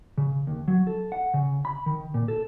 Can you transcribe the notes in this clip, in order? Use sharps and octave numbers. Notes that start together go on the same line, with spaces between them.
C#3
D#2
F#3
A4
F#5
C#3
B5
D#3
A#2
A4